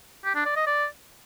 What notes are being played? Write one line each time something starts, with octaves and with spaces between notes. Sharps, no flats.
G4
D4
D5
D#5
D5